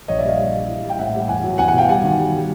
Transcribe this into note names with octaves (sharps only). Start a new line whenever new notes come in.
A#1 C#5 D#5
D5 E5
G3
D#5 F5
G3
G3
E3
G3
G5
A2 E5 F#5
G3
E2 F#5 G#5
F#3
E2 F#5 G#5
F#5 G#5
B2 F5 G5
G3 F#5 G#5
D#3
G3
G3